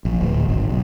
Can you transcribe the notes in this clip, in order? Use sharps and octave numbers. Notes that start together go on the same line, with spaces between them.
A#1
D1
G#1
B1